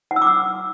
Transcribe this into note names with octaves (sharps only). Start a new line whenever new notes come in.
F#5
E6
D6
E6